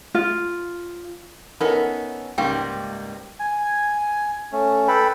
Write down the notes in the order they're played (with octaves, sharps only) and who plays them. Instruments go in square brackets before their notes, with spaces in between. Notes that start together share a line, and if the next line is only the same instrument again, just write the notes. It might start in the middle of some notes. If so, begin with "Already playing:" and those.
[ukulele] F4
[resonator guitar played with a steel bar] B3 C#4 [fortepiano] D#4 A4 B5 [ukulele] A#4 E5 F#5
[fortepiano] C#2 C#6 [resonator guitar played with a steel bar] G#2 G3 A#3 [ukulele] C#4 [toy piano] G5
[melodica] G#5
A3 C#4
A4 B4 G5 B5